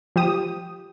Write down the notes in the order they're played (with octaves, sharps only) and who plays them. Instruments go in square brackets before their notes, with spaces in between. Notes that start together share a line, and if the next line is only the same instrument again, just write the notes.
[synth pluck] F3 G4 D#6